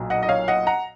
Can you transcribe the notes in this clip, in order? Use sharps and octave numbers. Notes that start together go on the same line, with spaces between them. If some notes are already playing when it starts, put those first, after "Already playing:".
Already playing: B1 A#2 F#3
D#5 F#5
D#5
C#5 F5
D#5 F#5
F#5 A#5